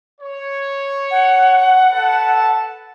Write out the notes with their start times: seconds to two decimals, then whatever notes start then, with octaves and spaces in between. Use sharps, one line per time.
0.21 C#5
1.11 F#5
1.91 A4 B4 A5